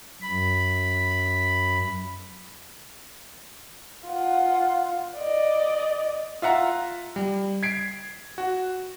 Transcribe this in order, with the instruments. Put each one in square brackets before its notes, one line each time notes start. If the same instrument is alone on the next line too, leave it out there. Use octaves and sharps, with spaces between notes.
[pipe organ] F#2 B5
[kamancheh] F4 F#5
D5 D#5
[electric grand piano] F4 E5 F#5 A#5
G3
G#6 B6 C7 D7
F#4